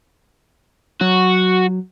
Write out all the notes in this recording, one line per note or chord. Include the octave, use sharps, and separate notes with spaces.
F#3 F#4